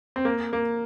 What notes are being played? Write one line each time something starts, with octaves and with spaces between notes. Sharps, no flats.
C4
A#3
A#3